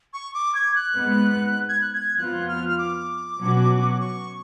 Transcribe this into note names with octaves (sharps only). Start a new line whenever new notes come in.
C#6
D6
G#6
F#6
G#2 G#3 B3
G#6
F#6
G#6
F2 F3 B3 F4 F#6
F6
F6
D6
B2 F#3 C#4 F#4
C#6